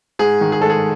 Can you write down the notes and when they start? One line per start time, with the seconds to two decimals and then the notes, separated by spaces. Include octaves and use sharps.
0.19 G#2 G#4
0.41 D#3
0.52 G#4
0.61 G#3 A4
0.70 G#4